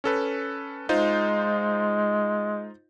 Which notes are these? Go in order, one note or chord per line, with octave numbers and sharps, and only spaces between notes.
C#4 A4 B4
G#3 D#4 F4 C5